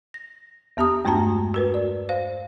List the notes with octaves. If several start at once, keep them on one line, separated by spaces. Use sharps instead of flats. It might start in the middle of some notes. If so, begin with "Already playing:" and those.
A#6
E2 B3 G4 A#5 D#6
G2 G#3 A3 D4 A5 A#5
F#4 A#4 B4
D5
C5 F5